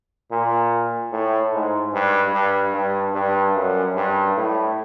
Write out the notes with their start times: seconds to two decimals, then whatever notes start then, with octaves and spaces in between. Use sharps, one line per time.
0.31 A#2
1.12 A2
1.53 G#2
1.93 G2
2.33 G2
2.74 G2
3.14 G2
3.55 F#2
3.95 G2
4.37 A2